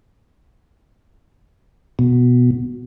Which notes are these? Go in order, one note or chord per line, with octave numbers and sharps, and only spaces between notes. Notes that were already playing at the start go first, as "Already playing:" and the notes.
B2